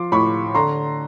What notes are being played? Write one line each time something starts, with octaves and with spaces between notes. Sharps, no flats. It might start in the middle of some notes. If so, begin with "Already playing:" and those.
Already playing: F3 C6 D6
A2 B5 C#6
D3 A#5 C6